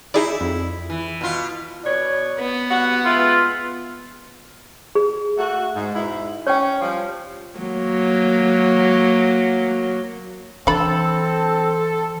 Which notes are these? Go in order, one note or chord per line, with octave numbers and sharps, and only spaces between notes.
D#4 E4 G#4 D5
F2
E3
B2 F4
B2 D4 C#5
B3
G3 F#4 F#5
G#3 E4 F4 B4
G#4
A3 F#4
G#2
G#2 B2 E4
C#4 C#5 G5
F3 G3
F#3 A#3
D3 E3 C4 A4 B5